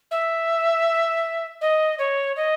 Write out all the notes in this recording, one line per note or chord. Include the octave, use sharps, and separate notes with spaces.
E5
D#5
C#5
D#5